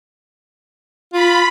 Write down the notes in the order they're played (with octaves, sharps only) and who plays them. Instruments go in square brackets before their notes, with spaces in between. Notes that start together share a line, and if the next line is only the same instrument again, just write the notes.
[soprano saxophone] F4 [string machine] B5